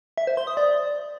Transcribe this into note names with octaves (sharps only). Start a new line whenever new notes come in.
E5
C5
C6
D#6
D5